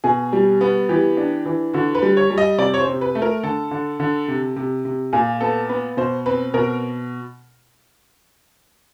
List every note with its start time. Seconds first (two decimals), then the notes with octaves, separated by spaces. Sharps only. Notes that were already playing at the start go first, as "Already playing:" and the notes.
0.04 B2 G#4
0.33 G3
0.61 B3
0.89 E3 G4
1.17 D4
1.46 E3
1.74 D3 F#4
1.95 B4
2.02 G3
2.17 C#5
2.30 G3
2.38 D#5
2.58 C3 D5
2.74 C#5
2.80 C5
2.87 C3
3.01 B4
3.15 A3
3.22 A#4
3.43 D3 A4
3.71 D3
4.00 D3
4.28 C3
4.56 C3
4.85 C3
5.13 A#2 G#4
5.41 B3 A4
5.69 B3 B4
5.97 B2 C5
6.26 C4 B4
6.54 B2 A#4